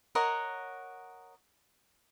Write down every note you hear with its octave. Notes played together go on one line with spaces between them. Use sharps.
A#4 C#5 D#5 F#5